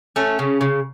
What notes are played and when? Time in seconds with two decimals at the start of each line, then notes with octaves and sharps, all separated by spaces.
0.16 A3 C#4
0.39 C#3
0.61 C#3